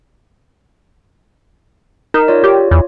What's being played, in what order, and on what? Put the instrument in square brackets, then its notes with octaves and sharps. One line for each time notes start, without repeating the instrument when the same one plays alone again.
[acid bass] D#4 [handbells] A#4
[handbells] F4 C#5 D5
[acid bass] G4
E2